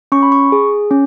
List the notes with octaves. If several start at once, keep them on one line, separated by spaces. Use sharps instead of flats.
C#4 C#6
B5
C#6
G#4
C#4